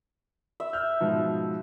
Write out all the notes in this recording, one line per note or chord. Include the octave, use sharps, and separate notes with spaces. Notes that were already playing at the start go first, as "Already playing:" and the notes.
E5
F6 G6
G#2 B2 F3